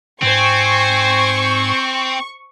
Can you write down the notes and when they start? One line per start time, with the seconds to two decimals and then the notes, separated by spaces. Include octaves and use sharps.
0.22 G#2 C4 C5 G#5 C#6